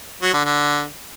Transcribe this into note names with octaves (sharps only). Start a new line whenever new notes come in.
F#3
D3
D3